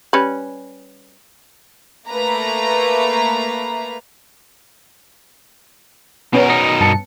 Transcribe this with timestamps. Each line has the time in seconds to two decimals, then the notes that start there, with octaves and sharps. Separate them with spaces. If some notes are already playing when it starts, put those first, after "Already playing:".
0.13 G3 C#4 B4
2.08 A3 A#3 B4 A#5
6.33 B2 B3 C#4 A#4
6.50 D#4
6.80 G2 A5 C#7